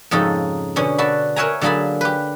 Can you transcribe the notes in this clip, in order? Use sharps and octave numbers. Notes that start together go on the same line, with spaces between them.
F2 G#2 C#3 D#4 A4
B2 D3 C#4
D4 F#4 A4 F#5 B5
A#4 C#5 E5 F#5 G#5 A#5
D3 F#3 A#3 G#4 A5 B5
G4 B4